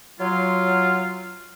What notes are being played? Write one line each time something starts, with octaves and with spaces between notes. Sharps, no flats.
F#3 F4